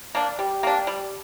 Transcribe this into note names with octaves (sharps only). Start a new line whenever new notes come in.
A#3 D4
G3 G4
A#3 D4
G3